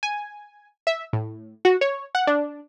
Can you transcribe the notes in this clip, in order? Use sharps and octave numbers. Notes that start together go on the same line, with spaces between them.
G#5
E5
A2
F#4
C#5
F#5
D4